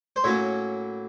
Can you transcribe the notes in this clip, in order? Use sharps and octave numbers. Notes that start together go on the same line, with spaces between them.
C5
A2 F#3 A#3 C#4 C#5